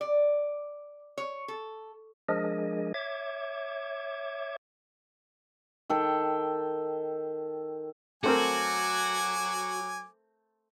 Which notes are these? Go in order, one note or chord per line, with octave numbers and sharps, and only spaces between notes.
D5
C#5
A4
F3 G#3 D4 G#4 A#4 D#5
C#5 E5 D6 G#6
D#3 A4 G5
F#3 A3 C4 F#4 A#4 G#5 D6